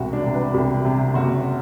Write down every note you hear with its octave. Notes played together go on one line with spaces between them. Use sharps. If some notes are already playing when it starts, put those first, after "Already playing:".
Already playing: E1 C2 F#4
D4
C3
B4
C2 G4
C3
F#1 F#4